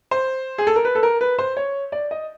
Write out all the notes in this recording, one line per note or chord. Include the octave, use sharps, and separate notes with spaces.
C5
G#4
A4
A#4
B4
A4
A#4
B4
C5
C#5
D5
D#5